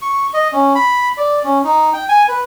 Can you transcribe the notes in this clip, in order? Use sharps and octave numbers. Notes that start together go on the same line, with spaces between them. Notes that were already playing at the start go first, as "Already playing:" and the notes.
C#6
D#5
C#4
B5
D5
C#4
D#4
G5
G#5
B4